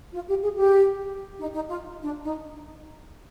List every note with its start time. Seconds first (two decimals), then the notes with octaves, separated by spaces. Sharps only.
0.14 F4
0.28 G4
0.42 G#4
0.57 G4
1.39 D#4
1.54 D#4
1.68 F4
2.02 D4
2.23 D#4